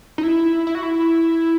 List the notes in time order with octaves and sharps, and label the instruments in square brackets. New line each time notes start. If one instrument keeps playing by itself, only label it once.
[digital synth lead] D#4
E4
E4
F#4
E4